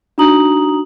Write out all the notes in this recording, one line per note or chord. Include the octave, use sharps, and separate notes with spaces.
D4 D#4 F#4 A#5 D#6 F#7